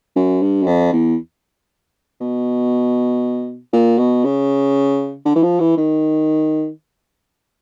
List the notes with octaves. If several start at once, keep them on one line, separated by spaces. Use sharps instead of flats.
F#2
G2
F#2
F2
E2
B2
A#2
B2
C#3
D3
E3
F3
E3
D#3